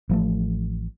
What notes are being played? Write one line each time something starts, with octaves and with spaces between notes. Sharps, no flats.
A1 F3 A3